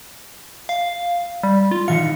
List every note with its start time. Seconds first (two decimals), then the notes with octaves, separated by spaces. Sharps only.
0.69 F5
1.43 G3
1.71 F4
1.88 D#3 E3 F5 C#7